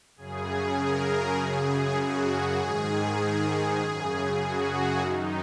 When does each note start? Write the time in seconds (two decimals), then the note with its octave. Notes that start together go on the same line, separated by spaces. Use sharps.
0.17 F#2 C#3 G#4
0.77 A#4
1.38 F#2 C#3 G#4
1.99 F#4
2.59 G#2 D#3 G#4
3.80 F#2 C#3
4.41 F#4
5.00 F#2 D#3 D#4